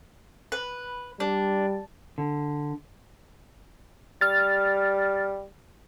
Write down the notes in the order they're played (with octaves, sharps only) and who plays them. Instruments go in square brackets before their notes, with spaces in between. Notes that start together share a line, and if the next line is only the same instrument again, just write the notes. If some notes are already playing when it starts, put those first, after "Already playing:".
[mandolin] B4
[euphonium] G3 [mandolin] D4
[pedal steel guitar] D3
[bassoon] G3 [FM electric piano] F6 A6